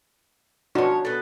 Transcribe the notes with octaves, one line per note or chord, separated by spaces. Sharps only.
F3 D4 D#4 F#4 C#5
B3 A4